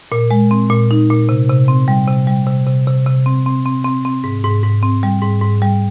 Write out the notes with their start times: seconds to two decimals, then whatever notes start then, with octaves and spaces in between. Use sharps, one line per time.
0.12 A#2
0.31 G#3
0.51 C4
0.70 A#2
0.91 D#4
1.10 A#2
1.29 C3
1.49 C3
1.68 C4
1.88 G3
2.08 C3
2.27 G3
2.47 C3
2.67 C3
2.87 C3
3.07 C3
3.26 C4
3.46 C4
3.66 C4
3.84 C4
4.05 C4
4.24 G#2
4.44 G#2
4.63 G#2
4.83 C4
5.03 G3
5.22 G#2
5.41 G#2
5.62 G3